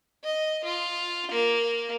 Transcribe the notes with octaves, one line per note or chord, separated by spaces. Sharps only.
D#5
F4
A#3